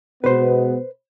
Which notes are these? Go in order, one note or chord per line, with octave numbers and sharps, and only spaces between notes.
B2 G#3 B3 B4 C5